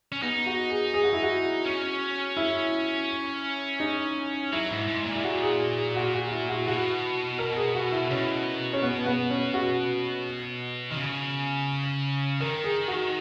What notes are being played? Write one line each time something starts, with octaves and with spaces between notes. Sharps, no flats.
C#4
B3 D#4
F#4
G#4
G#4
F#4
E4
F#4
C#4
E4
D#4
F#3 E4
G#2
G#2
A#2
E4
F#4
G#4
G#4
G#4
F#4
F#4
F#4
E4
F#4
B2 F#4
A#4
G#4
F#4
E4
B2 C#4
C#4
B3
B3
C#4
F#4
D#3
C#3
D#3 A#4
G#4
F#4